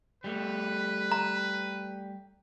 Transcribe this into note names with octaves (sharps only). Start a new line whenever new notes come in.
G3 A3 B4
A#5